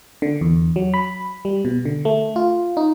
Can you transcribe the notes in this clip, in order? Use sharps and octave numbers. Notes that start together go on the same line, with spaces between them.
D3
E2
F#3
B5
G3
B2
D3
A3
F4
D#4